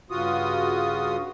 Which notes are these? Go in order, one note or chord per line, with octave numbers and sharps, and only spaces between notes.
G2 C#3 F4 F#4 D#6